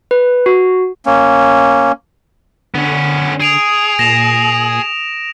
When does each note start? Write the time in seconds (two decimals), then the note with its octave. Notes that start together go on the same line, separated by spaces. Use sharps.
0.11 B4
0.46 F#4
1.06 A#3 C#4
2.75 D3 B3 C#4
3.40 G#4 D#6 D7 F7
3.99 A#2 A#6 E7 F7